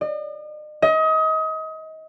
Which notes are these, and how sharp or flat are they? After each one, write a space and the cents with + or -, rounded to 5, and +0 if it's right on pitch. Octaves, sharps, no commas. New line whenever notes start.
D#5 -45
D#5 +30